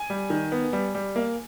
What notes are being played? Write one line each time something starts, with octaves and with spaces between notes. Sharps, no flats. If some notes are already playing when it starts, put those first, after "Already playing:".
Already playing: G#5
G3
D#3
B3
G3
G3
A#3